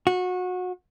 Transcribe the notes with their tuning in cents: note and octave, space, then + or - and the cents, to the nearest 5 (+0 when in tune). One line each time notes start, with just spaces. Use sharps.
F#4 -25